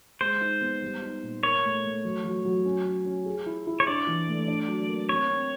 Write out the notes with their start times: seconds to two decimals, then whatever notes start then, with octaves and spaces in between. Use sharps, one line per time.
0.21 G#3 C5
0.41 D#4
0.61 B3
0.82 G3
1.02 D#4
1.23 A#2
1.43 A#4 C#5
1.64 A3
1.84 A3
2.04 F#3
2.24 F#3
2.45 F#3
2.65 C#4
2.85 C#4
3.05 C#4
3.26 G#4
3.46 E4
3.67 E4
3.80 C#5
3.87 D4 D5
4.07 E3
4.28 A3
4.48 D4
4.68 F#3
4.89 A#3
5.09 C4 C#5
5.30 C4